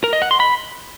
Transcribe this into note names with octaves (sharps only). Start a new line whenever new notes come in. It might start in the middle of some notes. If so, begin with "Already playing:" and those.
A#4
D#5
F#5
C6
B5